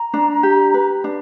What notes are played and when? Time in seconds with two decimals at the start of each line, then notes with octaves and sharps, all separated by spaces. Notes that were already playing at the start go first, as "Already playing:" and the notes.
Already playing: A#5
0.14 D4
0.43 G4
0.74 B4
1.04 D4